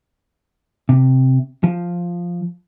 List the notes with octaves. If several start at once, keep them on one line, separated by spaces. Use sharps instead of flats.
C3
F3